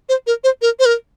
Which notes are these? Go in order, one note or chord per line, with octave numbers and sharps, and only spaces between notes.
C5
A#4
C5
A#4
C5
A#4